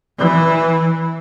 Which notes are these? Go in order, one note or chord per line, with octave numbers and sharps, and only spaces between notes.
E3